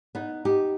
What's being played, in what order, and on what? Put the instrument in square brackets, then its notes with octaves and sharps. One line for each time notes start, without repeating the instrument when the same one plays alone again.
[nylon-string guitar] B3 D#4
D#4 G4